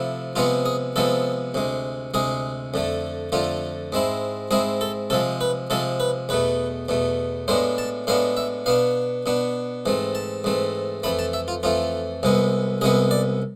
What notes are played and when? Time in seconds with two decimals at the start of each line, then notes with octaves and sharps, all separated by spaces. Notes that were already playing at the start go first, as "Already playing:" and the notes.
Already playing: C3 F3 A3 E4
0.36 C3 F3 G#3 B3 F4
0.66 G#4
0.96 C3 F3 G#3 B3 A4
1.54 D2 C3 G#3
2.14 D2 C3 G#3 G#4
2.74 F2 D3 A3
3.32 F2 D3 A3 F4
3.92 G#2 G#3 C4 E4
4.51 G#2 G#3 C4 E4 G#4
4.81 A4
5.10 C3 F3 G#3 A4
5.41 B4
5.70 C3 F3 G#3 A4
6.00 B4
6.29 E2 B2 A3 B4
6.89 E2 B2 A3
7.48 A2 G#3 B3 D4 C5
7.78 A5
8.07 A2 G#3 B3 D4 F5
8.37 E5
8.66 B2 B3 D4 F5
9.26 B2 B3 D4
9.86 G#2 E3 A3 C4
10.15 A5
10.44 G#2 E3 A3 C4
11.03 F2 E3 A3 B5
11.19 A5
11.33 E5
11.48 F4
11.63 F2 E3 A3 F4
12.23 C2 C3 G#3 B3
12.81 C2 C3 G#3 B3 G#4
13.11 D5